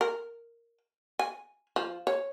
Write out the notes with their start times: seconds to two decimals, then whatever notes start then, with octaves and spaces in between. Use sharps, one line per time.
0.01 A#4
1.19 G#5
1.76 F3
2.07 C#5